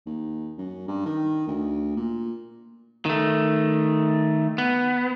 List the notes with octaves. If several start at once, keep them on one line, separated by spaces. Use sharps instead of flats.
D#2
F#2
G2
D#3
D2
A#2
D#3 A3
B3